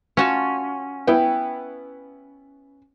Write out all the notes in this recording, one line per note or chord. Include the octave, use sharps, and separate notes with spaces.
C#4 F4 F#4 A5
B3 E4 G5